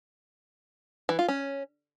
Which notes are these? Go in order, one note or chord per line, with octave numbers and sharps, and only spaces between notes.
E3
F4
C#4